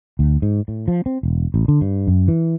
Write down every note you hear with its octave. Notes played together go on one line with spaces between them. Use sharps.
D2
G#2
A2
F3
C4
E1
A1
D3
G2
F#2
E3